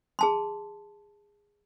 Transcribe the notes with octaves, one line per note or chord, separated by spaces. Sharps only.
G#4 A5 C6